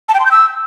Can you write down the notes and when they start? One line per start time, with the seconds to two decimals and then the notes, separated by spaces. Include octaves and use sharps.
0.09 A5
0.14 G5
0.20 C6
0.25 G6
0.31 E6